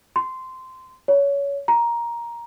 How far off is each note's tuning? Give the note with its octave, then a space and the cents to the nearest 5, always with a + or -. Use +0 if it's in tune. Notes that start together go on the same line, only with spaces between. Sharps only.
C6 -15
C#5 +20
A#5 +10